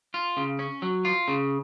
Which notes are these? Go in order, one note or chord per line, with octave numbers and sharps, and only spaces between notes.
F4
C#3
C#4
F#3
F4
C#3